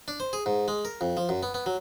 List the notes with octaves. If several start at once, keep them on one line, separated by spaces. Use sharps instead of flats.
D4
C5
G#4
G#2
G#3
A#4
F2
F3
F#2
B3
B3
F#3